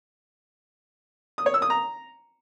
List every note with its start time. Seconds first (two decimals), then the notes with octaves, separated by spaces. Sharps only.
1.38 D#6
1.46 C#5
1.54 E6
1.62 D#6
1.70 A#5